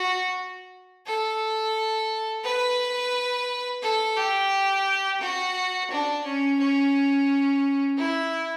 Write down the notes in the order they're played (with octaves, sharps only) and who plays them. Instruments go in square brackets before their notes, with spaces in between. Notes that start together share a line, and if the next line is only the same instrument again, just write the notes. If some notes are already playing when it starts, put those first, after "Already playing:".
Already playing: [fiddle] F#4
A4
B4
A4
G4
F#4
D4
C#4
C#4
E4